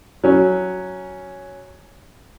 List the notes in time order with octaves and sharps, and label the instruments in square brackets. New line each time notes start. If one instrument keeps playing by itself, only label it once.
[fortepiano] F#3 C#4